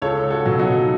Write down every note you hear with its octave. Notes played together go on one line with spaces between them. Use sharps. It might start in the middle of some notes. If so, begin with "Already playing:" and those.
C#2 A4 C#5
F#4 A4
B2 F#3
D#4 F#4